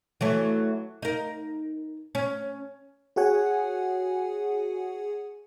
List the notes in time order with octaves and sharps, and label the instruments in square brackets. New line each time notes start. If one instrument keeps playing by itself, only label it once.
[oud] E3 F#3 A3
D#4 A#4
C#4
[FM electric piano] F#4 G#4 C#5 F#5 G#5